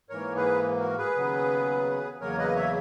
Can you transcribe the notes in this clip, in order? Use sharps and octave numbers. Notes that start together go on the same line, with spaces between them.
G#2 E3 A#3 A#4 C#5
G#4 B4
F#4 A#4
G#4 B4
D#2 C#3 F#3 B3
E2 C#3 F#3 A#3 A#4 C#5
B4 D#5
C#5 E5